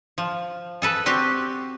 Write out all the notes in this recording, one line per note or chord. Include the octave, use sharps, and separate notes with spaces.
F3
G#4 A4 B4
C4 F#4 G4